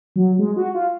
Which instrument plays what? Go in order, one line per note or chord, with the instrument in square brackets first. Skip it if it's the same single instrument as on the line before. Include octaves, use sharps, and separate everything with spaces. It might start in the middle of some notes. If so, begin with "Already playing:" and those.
[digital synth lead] F#3
G#3
F#4
F4